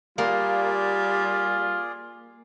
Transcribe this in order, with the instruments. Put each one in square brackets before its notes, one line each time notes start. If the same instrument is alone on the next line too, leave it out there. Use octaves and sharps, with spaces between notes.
[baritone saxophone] G3 [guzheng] A#3 [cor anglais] F4 [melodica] G#4 D5